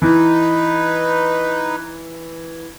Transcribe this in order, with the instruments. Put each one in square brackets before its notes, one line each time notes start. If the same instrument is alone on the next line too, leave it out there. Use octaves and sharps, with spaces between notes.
[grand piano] E3 [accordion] D#4 B4